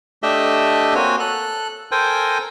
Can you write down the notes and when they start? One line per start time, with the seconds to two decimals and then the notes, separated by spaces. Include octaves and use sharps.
0.23 A3 D4 G4 D#5 E5
0.95 A#3 C4 F#4 C#5 G#5
1.20 A4 F#6
1.92 A4 A#4 C5 G5 G#5